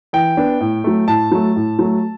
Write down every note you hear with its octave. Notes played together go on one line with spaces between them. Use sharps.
E3 G5
B3 D4
A2
F#3 A3
A2 A5
F#3 A3
A2
F#3 A3